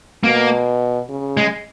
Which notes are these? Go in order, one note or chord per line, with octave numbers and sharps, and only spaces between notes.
B2 A#3
C#3
G#3